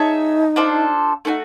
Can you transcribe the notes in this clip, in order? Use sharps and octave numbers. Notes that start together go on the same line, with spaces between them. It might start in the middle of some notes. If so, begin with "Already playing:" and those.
Already playing: D#4 G#4 C#5 E5 A5
D4 F4 A4 C5
A3 D4 D#4 F#4